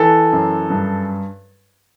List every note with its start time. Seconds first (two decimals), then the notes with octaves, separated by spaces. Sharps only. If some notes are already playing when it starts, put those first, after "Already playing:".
Already playing: E3 A4
0.33 F#2
0.70 G2